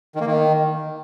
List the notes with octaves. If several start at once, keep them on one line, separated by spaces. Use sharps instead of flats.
D#3
A#3
D#3